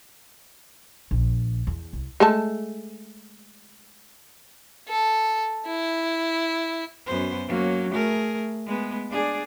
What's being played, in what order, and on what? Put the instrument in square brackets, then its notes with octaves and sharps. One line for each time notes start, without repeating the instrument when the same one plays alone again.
[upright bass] A#1
E2
C2
[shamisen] G#3 A3 A5
[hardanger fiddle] A4
E4
[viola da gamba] F#2 B3 C5
F#3 A#3 C#4
A3 G#4 A#4
G#3 B3
D4 G#4 D5